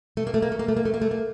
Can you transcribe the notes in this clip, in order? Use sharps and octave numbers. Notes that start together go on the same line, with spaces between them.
A3
A#3
A3
A#3
A3
A#3
A3
A#3
A3
A#3
A3
A#3